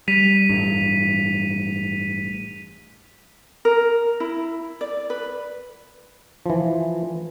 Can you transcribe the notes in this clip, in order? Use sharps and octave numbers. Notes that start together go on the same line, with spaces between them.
G3 B6 D#7 F7
A1 G2
A#4
E4
D5
B4
E3 F3